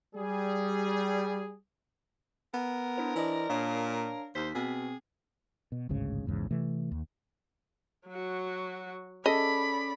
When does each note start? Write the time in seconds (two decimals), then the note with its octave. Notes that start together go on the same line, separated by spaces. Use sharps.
0.15 G3 G#4
2.54 B3 A#4
2.98 D4 E4 C5
3.15 E3 C5 D5 D#5
3.50 A#2 D4 C#5 F5
4.35 D#2 C5 B6
4.55 B2 C4 G#4
5.72 B2
5.89 A1 D2 G#2 C#3
6.26 A#1 E2 G#2 C#3
6.51 C3 E3 A3
6.91 D#2
8.08 F#3 F#4
9.26 C#4 G#4 A4 D5 D#5 B5